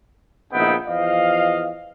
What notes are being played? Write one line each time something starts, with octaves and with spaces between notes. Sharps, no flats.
A#1 C#3 B3 D#4 E4 G5
E2 F3 D#5 F5